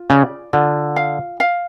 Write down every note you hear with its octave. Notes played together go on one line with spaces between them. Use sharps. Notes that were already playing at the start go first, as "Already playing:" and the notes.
Already playing: F4
C#3 D5
D3 F4
F5
F5